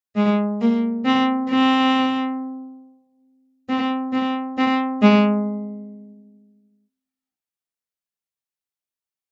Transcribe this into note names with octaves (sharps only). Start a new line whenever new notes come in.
G#3
A#3
C4
C4
C4
C4
C4
G#3